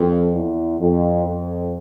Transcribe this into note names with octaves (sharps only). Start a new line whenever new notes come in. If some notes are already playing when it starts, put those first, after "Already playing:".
Already playing: F2
E2
F2
F2